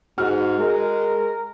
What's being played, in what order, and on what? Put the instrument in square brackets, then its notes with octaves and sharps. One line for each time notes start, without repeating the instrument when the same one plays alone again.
[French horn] G#2 [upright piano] F#4 F6
[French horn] G#3 [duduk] A#4